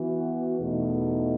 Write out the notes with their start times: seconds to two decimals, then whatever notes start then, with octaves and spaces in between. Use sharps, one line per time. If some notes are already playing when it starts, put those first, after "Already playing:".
Already playing: E3 B3 F#4
0.60 E2 B2 A3 D#4